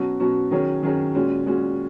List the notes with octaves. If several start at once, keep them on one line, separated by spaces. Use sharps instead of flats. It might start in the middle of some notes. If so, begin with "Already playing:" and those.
Already playing: B2 F#3 C#4 F#4
B2 F#3 C#4 F#4
D#3 F#3 C#4 G#4 C#5
D#3 F#3 C#4 G#4 C#5
A#2 G#3 C#4 F#4
A#2 G#3 C#4 F#4